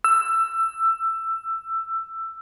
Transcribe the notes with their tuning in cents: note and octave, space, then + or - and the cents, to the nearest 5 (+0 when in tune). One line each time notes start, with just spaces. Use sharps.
E6 +15